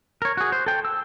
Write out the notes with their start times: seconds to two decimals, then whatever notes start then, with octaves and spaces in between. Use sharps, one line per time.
0.22 A#4 C#5
0.37 F#4 G#4
0.52 C5
0.66 A4 G5
0.85 E6